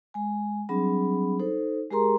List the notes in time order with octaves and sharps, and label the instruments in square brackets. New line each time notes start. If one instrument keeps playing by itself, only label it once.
[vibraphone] G#3 G#5
F#3 G3 C4 D4 G#4 B5
D#4 A4 C5
G#3 G4 G#4 A#4 A#5 C6